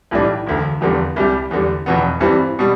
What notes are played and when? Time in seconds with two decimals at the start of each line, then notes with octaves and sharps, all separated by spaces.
0.11 B1 A2 E3 G3 D4
0.46 E1 D2 D3
0.81 F1 E2 D3 G3
1.16 C2 C3 G3 D4 G4
1.51 E2 D3 G3
1.86 F1 E2 B2 B3
2.20 G2 E3 G3 C4
2.59 B2 G3